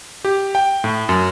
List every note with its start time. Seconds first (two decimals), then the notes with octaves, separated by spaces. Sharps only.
0.25 G4
0.55 G5
0.84 A2
1.09 F#2